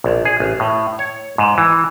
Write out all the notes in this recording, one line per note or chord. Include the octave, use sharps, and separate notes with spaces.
A#1
G#4
A1
A2
C#5
G#2
E3